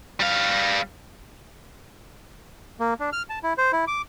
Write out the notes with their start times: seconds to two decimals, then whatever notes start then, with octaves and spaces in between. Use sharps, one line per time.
0.20 G3 F5
2.80 A#3
3.00 D4
3.13 F6
3.30 A5
3.43 E4
3.58 C5
3.73 E4
3.87 D6